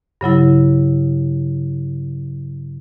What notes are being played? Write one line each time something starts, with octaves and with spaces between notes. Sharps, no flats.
G2 C#3 F#3 E4